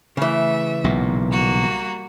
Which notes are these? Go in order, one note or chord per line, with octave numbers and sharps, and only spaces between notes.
C#3 E3 A3 E5
B1 A#2
G3 A#3 F#4